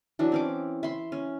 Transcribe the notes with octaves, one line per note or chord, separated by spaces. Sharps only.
E3 F#3 D4
C4 C#4 D6
E5 B5 C6
C#4